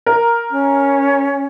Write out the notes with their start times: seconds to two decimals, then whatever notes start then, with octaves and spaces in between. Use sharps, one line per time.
0.06 A#4
0.51 C#4